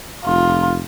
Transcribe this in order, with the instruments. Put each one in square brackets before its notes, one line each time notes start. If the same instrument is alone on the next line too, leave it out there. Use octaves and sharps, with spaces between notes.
[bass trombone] F1 [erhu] F4